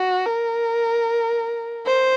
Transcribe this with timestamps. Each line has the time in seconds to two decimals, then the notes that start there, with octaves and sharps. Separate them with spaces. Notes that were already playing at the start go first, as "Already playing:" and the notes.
Already playing: F#4
0.26 A#4
1.87 C5